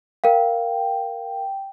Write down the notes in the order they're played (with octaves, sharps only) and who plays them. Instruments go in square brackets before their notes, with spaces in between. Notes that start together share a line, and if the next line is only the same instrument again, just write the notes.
[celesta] A#4 F5 [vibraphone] G5